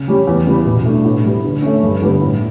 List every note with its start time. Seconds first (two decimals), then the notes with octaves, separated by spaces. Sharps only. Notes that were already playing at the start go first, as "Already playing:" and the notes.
Already playing: C#3
0.08 G3 C#4 G4
0.27 E2
0.47 C#3 E3 G3 B3
0.66 B2
0.85 A3 D4
1.05 A2
1.25 G3 B3
1.44 D3
1.62 A3 C#4
1.83 G2
2.02 D3 G3 B3
2.22 A2